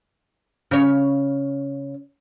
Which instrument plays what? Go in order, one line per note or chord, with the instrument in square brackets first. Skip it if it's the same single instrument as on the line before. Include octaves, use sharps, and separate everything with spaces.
[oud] C#3 C#5